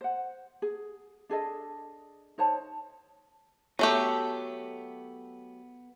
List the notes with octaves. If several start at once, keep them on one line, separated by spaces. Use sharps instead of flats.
C5 F#5
G#4
D4 G#4 A4 D#5
D#4 C5 C#5 A5
F#3 A3 B3 G4 A4